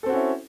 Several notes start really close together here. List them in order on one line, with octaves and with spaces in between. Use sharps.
A4 C4 F#4 C#4 E4